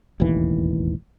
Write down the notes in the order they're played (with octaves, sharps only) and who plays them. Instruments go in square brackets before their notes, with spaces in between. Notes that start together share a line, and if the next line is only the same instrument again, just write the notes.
[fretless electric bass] E1 A1 D#2 E3